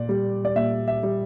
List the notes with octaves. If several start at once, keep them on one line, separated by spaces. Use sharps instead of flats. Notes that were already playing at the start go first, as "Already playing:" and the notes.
Already playing: A#2 D5
G3
D5
A#2 E5
E5
G3